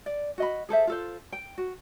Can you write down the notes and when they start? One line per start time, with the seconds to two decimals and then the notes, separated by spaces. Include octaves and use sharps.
0.06 D5
0.38 F#4 D#5 B5
0.69 G#4 A4 C5 E5
0.87 F4 A4 C5
1.32 G5
1.58 F#4